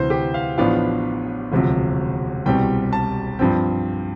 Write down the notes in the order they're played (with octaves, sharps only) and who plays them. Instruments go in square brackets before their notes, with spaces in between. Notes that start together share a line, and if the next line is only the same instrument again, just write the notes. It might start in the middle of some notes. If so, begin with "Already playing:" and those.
Already playing: [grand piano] D2 C3 E3 C5
G4
F5
A1 A2 F3 B3 D4 F5
E1 D2 C3 F3
C2 B2 G3 C4 G5
A5
G2 F3 C4 G5